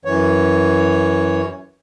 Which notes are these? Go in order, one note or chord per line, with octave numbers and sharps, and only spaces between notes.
F#2 E3 C#5